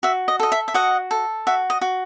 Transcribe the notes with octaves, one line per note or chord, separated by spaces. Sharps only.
F#4 E5
D#5
A4 D#5
E5
E5
F#4 D#5 F#5
A4
F#4 E5
D#5
F#4